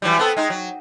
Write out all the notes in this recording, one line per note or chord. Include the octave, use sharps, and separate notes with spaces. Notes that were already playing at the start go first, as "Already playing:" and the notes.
E3 F#3 G3
B3 C4 A4
G#3 D#4
F#3